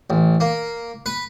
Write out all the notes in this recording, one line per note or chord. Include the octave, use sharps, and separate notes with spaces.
A1
A#3
B4